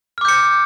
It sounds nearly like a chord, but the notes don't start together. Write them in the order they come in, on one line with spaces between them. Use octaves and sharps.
F6 D6 G6 C#7